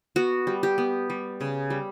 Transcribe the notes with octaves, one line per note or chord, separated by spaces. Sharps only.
B3 F#4
G3
G4
B3
G3
C#3
G3